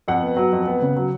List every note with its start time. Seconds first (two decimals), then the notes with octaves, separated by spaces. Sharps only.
0.08 F2 F#5
0.22 B3
0.37 F#3
0.53 F2
0.67 B3
0.82 C#3
0.97 F#3